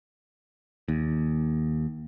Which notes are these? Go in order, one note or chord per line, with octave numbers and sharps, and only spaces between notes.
D#2